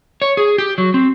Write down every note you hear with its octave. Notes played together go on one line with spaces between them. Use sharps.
C#5
G#4
G4
F#3
C4